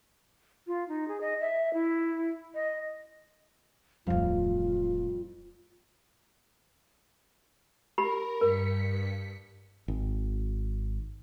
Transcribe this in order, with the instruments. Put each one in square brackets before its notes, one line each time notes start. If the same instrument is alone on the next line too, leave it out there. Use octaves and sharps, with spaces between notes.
[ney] F4
D#4
G#4
D#5
E5
E4
D#5
[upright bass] D1 G3 [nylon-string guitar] F2 C5 F5 [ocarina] F4
[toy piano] G4 B5 [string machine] A#4
[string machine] G2 B6 C#7 [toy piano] A#4
[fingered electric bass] G#1